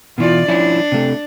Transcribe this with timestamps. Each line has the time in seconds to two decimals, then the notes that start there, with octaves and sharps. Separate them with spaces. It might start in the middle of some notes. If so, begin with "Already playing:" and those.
0.18 B2 E3 E4 F4 D5
0.48 F3 C#4 D4 E4
0.92 C3 A3